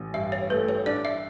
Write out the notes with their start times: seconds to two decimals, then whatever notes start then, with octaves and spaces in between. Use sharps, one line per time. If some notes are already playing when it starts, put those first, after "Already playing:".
Already playing: A1
0.14 G2 E5
0.32 C#5
0.50 A3 B4
0.69 C#5
0.86 D4 D5
1.05 E5